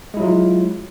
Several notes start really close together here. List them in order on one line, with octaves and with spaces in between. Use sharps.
G#3 E4 F#3 F4